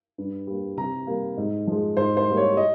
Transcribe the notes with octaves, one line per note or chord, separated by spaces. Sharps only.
G2
G3 A#3
C3 A#5
G3 A#3
G#2
F3 G#3
G#2 C5
C5
G3 A#3
C#5
D#5